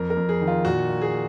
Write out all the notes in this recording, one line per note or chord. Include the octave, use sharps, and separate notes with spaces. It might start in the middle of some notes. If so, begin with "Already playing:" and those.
Already playing: F2 A#4
A#4
F2
G#4
D#3
F4
A#2 F#4
A#3
G#4